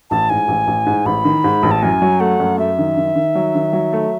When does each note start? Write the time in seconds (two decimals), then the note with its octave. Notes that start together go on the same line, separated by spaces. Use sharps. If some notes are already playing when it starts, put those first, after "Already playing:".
0.10 A1 A5
0.30 G#2 G#5
0.48 A1
0.67 A1
0.86 G#2
1.05 A1 B5
1.25 D#3
1.44 G#2
1.63 A1
1.71 A5
1.82 F#2 G#5
2.02 F#3
2.20 A3 F#5
2.40 F#2
2.58 F#2 E5
2.78 D#3
2.97 D#3
3.15 D#3
3.35 F#3
3.55 D#3
3.73 F#3
3.93 A3